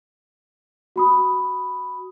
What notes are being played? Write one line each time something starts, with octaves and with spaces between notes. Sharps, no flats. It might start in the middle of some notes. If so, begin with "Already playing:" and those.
F#4 B5 D#6